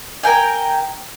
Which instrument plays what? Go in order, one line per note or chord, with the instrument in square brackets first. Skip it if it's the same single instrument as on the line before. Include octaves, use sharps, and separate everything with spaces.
[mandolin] A#4 G5 G#5